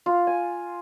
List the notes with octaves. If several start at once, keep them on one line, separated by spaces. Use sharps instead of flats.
F4
G#5